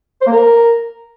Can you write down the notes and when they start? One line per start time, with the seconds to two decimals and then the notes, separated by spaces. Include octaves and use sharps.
0.22 C5
0.27 A#3
0.32 A#4